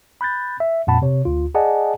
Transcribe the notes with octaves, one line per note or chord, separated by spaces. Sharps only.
B5 F#6 G6 A6
E5
F2 A#2 F#5 A5 B5
C3 C#5
D2 F4
G#4 D5 D#5 F#5 G#5 A5